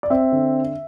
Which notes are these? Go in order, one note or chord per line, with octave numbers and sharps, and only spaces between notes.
D5
C4 E5
D3